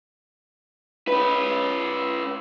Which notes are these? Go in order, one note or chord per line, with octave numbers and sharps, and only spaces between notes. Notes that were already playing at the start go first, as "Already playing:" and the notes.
C#4 B4